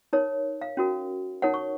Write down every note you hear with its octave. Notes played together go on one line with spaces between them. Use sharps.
D#4 A#4 C#5
F5
C#4 F#4 A#4
D#4 A#4 C#5 F#5
C#6